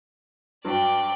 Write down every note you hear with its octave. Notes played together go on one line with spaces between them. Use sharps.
G2 F#3 D5 G5